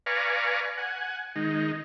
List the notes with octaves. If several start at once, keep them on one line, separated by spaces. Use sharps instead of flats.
B4 D5 F5 G#5 A#5 C#6
F#5 G#5
D#3 G#3 D#4